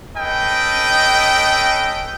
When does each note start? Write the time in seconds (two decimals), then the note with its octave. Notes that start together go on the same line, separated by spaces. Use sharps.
0.17 C#4 A4 B4 D#5 G5